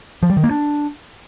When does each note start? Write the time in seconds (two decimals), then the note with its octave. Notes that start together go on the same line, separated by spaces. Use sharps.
0.23 F3
0.30 G3
0.37 D#3
0.44 A#3
0.51 D4